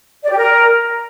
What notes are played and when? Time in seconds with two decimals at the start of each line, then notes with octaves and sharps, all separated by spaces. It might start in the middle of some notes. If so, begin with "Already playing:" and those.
0.23 D5
0.30 G4
0.37 A#4